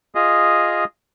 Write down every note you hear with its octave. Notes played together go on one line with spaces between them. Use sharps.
F4 G#4 D#5